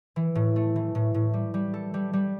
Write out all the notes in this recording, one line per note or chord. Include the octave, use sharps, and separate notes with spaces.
E3
A2
A3
E3
A2
A2
G3
G3
A4
G3
G3